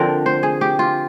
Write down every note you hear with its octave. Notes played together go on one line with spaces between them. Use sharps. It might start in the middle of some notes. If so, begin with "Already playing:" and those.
Already playing: D3 F3 C4 A#4 C5
C5
G#4
G4
F4